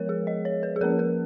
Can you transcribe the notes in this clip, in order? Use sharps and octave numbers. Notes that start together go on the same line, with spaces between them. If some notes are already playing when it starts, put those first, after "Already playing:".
Already playing: F3 G#3 B3 A#4 C#5
G#4
D#5
C#5
B4
G#4
F3 A#3 C#4 A#4
A#4